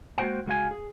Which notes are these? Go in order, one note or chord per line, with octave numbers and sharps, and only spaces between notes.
G#3 A#3 F#4 C5 F#5 G5
C#2 G#3 F#4 F5 G#5
G#4